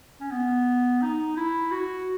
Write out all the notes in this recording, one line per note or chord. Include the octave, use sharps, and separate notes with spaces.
C#4
B3
D#4
E4
F#4